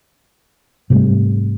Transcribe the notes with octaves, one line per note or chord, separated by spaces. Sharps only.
G#2 C3 G3 A3